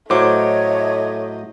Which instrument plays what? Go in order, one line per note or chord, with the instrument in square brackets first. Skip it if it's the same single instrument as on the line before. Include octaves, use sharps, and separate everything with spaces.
[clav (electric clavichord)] A2 F#3 [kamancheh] A3 D#5 [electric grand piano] C5 D6 [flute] C#5